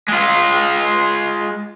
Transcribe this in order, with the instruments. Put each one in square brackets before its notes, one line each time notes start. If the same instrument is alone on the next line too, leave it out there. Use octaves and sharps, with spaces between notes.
[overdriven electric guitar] G#3 F4